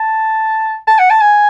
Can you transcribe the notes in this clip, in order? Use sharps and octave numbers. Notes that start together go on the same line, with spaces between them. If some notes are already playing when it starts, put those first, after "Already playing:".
Already playing: A5
A5
F#5
A5
G#5